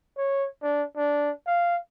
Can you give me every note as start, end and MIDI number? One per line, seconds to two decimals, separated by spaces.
0.17 0.48 73
0.62 0.84 62
0.96 1.31 62
1.47 1.76 77